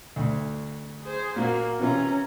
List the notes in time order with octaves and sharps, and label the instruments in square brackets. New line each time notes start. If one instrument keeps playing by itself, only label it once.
[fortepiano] D2
[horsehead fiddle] G#4 C5
[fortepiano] A#2 [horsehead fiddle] A#3 F#4
[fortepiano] C3 E3 F4 [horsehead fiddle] C#4 A#5